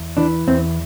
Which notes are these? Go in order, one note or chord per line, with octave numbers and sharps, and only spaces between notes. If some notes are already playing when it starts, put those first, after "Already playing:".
Already playing: E2
E3 D4
E2 C4